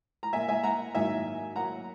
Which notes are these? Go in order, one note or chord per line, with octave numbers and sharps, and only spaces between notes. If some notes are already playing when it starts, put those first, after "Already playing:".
A#5
A#2 A#3 E5 G#5
E5 G#5
F#5 A#5
G#2 D#3 F#3 A#3 E5 G#5
A#2 F#3 A#3 F#5 A#5